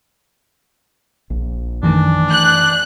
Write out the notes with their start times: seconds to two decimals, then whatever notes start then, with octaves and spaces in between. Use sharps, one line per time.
1.30 A#1
1.83 F#2 D#3 E3 A3 D4
2.31 F#6 G6